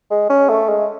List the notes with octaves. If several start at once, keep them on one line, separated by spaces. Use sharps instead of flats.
G#3
C#4
A3
G#3